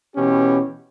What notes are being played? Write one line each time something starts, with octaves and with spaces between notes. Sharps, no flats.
B2 E3 C#4 G4